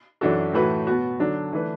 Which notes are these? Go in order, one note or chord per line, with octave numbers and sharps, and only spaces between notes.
F#2 E3 D4 F#4 A4
A2 E3 A3 F#4 B4
B2 B3 F#4
D3 F#3 D4
E3 A3 D4 B4